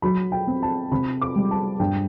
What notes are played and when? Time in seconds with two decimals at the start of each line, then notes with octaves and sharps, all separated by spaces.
0.02 F#3 B5
0.32 G5
0.47 C4
0.63 A5
0.92 C3 B5
1.21 D6
1.36 G3
1.51 A5
1.80 G2 G5